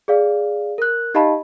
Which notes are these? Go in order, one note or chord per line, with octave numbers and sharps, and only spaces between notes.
G#4 D5 F5
A#4 F#6
D#4 G4 D#5 F5 A5 B5